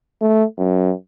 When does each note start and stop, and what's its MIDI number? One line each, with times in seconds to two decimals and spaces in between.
0.21 0.44 57
0.58 0.93 42